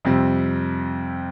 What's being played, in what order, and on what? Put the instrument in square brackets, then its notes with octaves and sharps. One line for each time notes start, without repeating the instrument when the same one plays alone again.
[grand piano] F2 C3 G3 C4